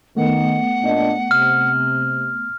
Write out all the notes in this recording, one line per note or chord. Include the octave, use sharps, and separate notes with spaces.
D#3 A3 B3 F#5
A#2 D4 D#5
C3 F6